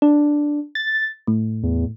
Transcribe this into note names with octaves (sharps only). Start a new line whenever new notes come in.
D4
A6
A2
E2